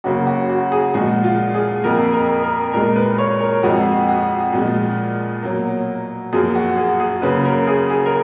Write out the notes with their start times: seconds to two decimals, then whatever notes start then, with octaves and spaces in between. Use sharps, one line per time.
0.04 F#2 C#3 F#3 A#3 F#4
0.27 F#4
0.50 F#4
0.72 G#4
0.94 A#2 F3 G#3 F#4
1.24 F4
1.54 G#4
1.83 F2 F3 A#3 A#4
2.14 A#4
2.43 A#4
2.73 A#2 G#3 A#4
2.96 B4
3.18 C#5
3.40 A#4
3.63 F2 F3 G#3 F#4
4.09 F#4
4.53 A#2 F3 G#3
5.43 B2 F#3 A#3
6.33 F#2 F3 A#3 G#4
6.55 F#4
6.77 G#4
7.00 G#4
7.22 F#2 C#3 F#3 A#3 B4
7.45 A#4
7.67 G#4
7.90 G#4
8.06 A#4